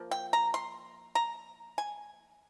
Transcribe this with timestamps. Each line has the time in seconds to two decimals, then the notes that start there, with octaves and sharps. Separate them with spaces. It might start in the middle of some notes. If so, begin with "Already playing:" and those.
Already playing: F3 A#3
0.11 G5
0.33 A#5
0.54 C6
1.15 A#5
1.78 G#5